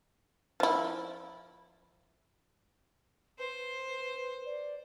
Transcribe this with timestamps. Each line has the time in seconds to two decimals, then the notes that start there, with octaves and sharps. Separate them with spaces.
0.60 F3 E4
3.39 B4 C5
4.45 D5